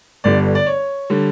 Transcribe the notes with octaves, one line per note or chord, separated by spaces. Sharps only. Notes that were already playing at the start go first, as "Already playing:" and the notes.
G1 G2 D3 G3 D5
D5
C#5
D3 G3